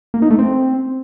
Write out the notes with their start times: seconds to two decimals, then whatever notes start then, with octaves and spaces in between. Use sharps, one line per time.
0.14 A#3
0.22 D#4
0.30 A3
0.39 C4